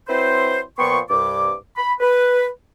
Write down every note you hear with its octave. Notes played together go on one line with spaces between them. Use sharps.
F#3 C4 E4 B4 C5
A#2 F3 B3 G5 C6 C#6
C2 G2 D6
B5
B4